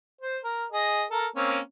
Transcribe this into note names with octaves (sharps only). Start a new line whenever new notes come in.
C5
A#4
G#4 D#5
A4 A#4
A#3 C4 C#4